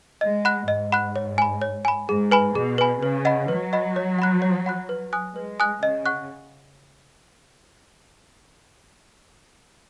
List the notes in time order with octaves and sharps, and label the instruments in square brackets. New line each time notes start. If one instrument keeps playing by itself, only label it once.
[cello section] G#3 [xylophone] D#5
[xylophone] F#5 B5 F#6
[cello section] G#2 [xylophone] D#5
[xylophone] F#5 B5 F#6
C#5
G#5 B5
C#5
G#5 B5
[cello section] G#2 [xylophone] G#4
[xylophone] B4 G#5 B5
[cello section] B2 [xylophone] G#4
[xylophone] B4 G#5 B5
[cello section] C#3 [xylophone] B4
[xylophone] D#5 F#5 B5
[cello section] F#3 [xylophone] B4
[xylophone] D#5 F#5 B5
C#5
F#5 B5 F#6
C#5
F#5 B5 F#6
B4
G#5 D#6 F#6
[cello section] G#3 [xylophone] B4
[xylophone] G#5 D#6 F#6
[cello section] C#3 [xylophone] D#5
[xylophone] F#5 C#6 F#6